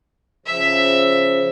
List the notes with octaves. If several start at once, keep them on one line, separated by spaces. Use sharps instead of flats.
C#3 F3 E5